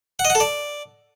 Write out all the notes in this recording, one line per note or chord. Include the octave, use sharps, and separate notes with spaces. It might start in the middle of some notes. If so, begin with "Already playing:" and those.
F#5
D#5
F#5
A4
D5